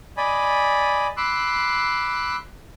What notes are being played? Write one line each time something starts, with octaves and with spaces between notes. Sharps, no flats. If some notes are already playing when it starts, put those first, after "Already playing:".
D5 D#5 G#5 B5
B5 C6 D6 E6 F#6